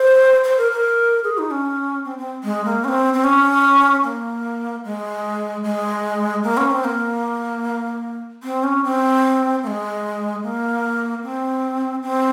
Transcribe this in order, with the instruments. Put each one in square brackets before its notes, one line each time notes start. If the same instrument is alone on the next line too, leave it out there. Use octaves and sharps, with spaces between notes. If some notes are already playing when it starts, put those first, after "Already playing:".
Already playing: [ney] C5
C5
A#4
A#4
G#4
D#4
C#4
C4
C4
G#3
A#3
C#4
C4
C4
C#4
A#3
G#3
G#3
A#3
C#4
C4
A#3
C4
C#4
C4
A#3
G#3
A#3
C4
C4